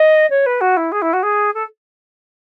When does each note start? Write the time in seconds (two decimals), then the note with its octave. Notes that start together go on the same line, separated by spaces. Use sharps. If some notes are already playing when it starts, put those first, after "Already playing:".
Already playing: D#5
0.30 C#5
0.46 B4
0.61 F#4
0.77 E4
0.92 G#4
1.02 E4
1.13 F#4
1.23 G#4
1.54 A4